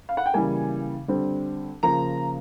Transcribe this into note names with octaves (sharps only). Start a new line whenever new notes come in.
F5
F#5
G5
C#3 E3 G3 A#3 G#5
D3 G3 C4
C#3 F3 A#3 A#5